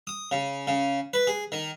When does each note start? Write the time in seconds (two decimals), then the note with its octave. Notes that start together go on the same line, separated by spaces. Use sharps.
0.07 D#6
0.31 C#3
0.67 C#3
1.13 B4
1.27 G#4
1.52 D#3